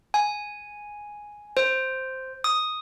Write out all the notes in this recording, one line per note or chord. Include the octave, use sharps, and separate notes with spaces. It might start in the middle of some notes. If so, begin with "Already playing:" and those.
G#5
C5
D#6